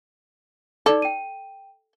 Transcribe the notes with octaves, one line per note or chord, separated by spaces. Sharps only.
D#4 A4 D5 D6
G5 D#7